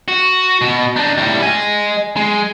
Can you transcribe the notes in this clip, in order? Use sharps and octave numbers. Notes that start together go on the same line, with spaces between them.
F#4
B2
D4 D#4
A2 G3
D#5 G#5
G#3